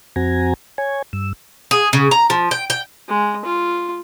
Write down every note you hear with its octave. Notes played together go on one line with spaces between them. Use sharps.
F2 C4 F#4 G#5 A#5
C#5 G#5
G2 E6
G#4
C#3
A#5
F3
G5
G5
G#3
F4